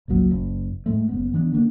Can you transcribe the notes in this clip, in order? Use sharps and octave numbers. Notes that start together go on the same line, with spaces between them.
G1 C#2 A#2 F#3
F#1
A2 G#3 A3
F#1 F2 B3
E3 B3 D4
D3 A#3 D4